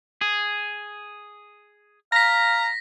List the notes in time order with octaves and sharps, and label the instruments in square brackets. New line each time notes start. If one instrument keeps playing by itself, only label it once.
[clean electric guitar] G#4
[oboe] F5 [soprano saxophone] A#5 [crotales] A#6 B6